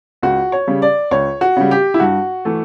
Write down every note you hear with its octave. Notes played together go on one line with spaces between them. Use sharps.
C#2 F#4
C#5
C#3 G3
D5
C#2 C#5
F#4
C#3 G3
G4
E4
G2 F#4
E3 A3